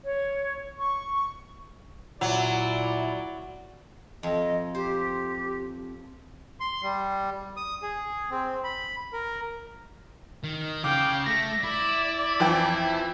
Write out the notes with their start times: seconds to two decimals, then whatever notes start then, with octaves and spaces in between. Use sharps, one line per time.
0.05 C#5
0.78 C#6
2.21 A#2 F#3 E4 D5
4.23 F2 D#5
4.75 G4 C5
6.60 C6
6.83 G3
7.57 D#6
7.83 G#4
8.30 C4
8.64 B5
9.13 A#4
10.44 D#3
10.84 C#3 F5 G5 D6
11.27 A3 A#6
11.63 E4 D5
12.40 F2 E3 G5